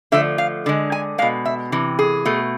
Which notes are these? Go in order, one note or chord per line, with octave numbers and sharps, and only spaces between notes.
D3 F3 A3 E5
F5
D3 G#3
G#5
B2 G#3 F5
E5
C3 E3
G#4
B2 A3